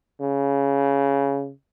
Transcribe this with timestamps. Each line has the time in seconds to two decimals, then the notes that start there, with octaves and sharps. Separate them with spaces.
0.20 C#3